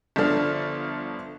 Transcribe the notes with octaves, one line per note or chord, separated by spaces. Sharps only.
G1 D3 F3 D4 A4 F6